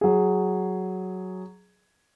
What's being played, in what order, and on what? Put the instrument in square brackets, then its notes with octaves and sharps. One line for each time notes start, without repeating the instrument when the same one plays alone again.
[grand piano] F#3 G#4